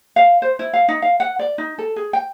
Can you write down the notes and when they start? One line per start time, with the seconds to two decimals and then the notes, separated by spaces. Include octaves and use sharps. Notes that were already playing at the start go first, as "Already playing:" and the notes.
0.16 F5
0.42 C5
0.59 E4
0.74 F5
0.89 D#4
1.02 F5
1.20 F#5
1.39 D5
1.58 D#4
1.78 A4
1.96 G#4
2.13 G5